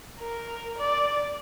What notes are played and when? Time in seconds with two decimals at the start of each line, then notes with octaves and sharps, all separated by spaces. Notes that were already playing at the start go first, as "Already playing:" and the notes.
0.20 A#4
0.78 D5